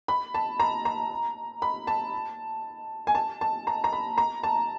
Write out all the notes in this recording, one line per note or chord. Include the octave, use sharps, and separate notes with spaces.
B5
A5
A#5
A#5
B5
A5
G#5
A5
A5
A#5
A#5
B5
A#5
A5